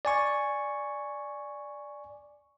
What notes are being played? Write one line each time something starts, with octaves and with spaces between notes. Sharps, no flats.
D5 G#5 C#6